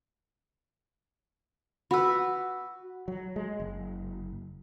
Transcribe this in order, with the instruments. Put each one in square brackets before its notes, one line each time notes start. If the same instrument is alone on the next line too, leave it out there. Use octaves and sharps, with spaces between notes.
[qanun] F#4 B4 [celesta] B5 E6
[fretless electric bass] F#3
G#3
F#1